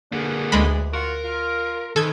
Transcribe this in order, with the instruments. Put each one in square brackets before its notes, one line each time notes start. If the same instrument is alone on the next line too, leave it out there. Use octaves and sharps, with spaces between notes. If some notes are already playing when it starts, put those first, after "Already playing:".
[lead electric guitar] D3 A#3 [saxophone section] B3 D4 G#4
[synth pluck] D2 G#3 B5
[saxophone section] F4 F#4 [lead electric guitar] A#4
[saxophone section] F4
[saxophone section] C3 G#4 B4 [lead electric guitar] D#3 [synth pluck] A4 G#6